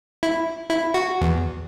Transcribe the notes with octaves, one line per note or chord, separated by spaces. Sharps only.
E4
E4
F#4
E2